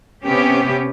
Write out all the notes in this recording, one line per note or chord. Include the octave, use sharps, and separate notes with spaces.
C3 B3 C#4 G4